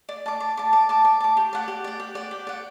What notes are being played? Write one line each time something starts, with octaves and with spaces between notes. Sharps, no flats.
D5
A5 D6
D5
A5 D6
D5
A5 D6
D5
A5 D6
G4
D5 F#5
G4
D5 F#5
G4
D5 F#5
G4
D5 F#5